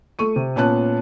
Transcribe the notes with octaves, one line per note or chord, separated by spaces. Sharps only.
A3 A4 C#6 D#7
C3
A#2 B3 C#4 A5 F#6